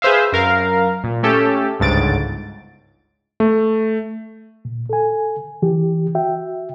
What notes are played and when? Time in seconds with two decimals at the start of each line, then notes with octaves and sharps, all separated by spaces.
0.02 G#4 B4 C5 E5 F5
0.33 F#2 A#4 F5
1.04 A#2
1.23 A3 C#4 G4 A4
1.80 G1 C#2 G#2 A6 D7
3.40 A3
4.65 A#2
4.90 A4 G#5
5.62 E3 G4
6.15 F#4 E5 G5